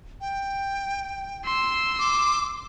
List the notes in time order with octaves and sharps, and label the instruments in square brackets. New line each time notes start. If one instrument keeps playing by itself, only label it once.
[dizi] G5
[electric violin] C6 E6
[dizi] D6